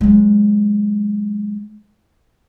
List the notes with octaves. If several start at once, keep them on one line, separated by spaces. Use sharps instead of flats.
F#3 G#3